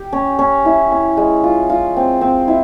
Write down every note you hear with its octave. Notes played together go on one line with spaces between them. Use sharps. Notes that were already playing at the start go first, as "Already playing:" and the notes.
Already playing: G4
C#4
C#4
E4
C#4
G#3
F4
F4
C4
C4
E4